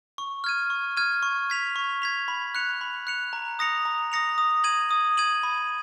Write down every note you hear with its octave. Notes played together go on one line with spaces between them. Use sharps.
C#6
F6 G#6 D#7
C#6
F6 G#6 D#7
C#6
G#6 B6 F7
C#6
G#6 B6 F7
B5
F#6 C#7 F7
B5
F#6 C#7 F7
A#5
D#6 A#6 C#7 F7
A#5
D#6 A#6 C#7 F7
D#6
G#6 D#7 F#7
D#6
G#6 D#7 F#7
B5